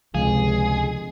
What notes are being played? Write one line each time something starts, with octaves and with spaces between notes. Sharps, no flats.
G1 C#2 C3 F3 G#3 G#4